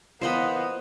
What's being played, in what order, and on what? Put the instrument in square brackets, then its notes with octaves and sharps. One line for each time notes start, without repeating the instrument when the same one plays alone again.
[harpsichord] A#2 E3 F4 [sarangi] B3 [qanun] C5 D#5 B5